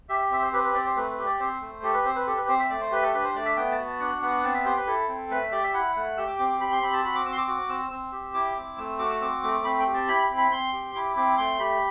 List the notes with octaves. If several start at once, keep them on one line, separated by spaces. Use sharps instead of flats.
G4 E5
C4 E5
C5
G4 B4
B4
C4 D5
C5
A3 B4
B4
G4
D5
C4 C5
A3
G4 A4
B4
C4 C5
B4
G4 A4
B4
C4 C5
E5
A3 D5
C5
G4 B4
A4
D4 B4
C5
A3 D5
E5
B3 G5
A5
F#4
A5
D4 F#5
B3 F#5
C4 A5
E5
G4 C5
B4
E4 A4
C4
A3 B4
E5
G4 D5
E5
E4 F#5
A3 F#5
G4 E6
D6
C4 D6
D6
G4 B5
C6
C4 B5
A5
F#4 B5
D6
C4 E6
C6
D6
F#4 D6
C4 E6
C4 E6
G4
E4 D6
C4
A3 E6
E6
F#4 D6
E6
C4 D6
A3 D6
C4 B5
G5
G4
A5
E4 B5
B5
C4
B5
C4 C6
G4
E4 D6
C4 D6
A3 C6
G4 B5